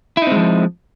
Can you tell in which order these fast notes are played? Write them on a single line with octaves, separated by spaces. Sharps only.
E4 D#4 C4 G#3 F3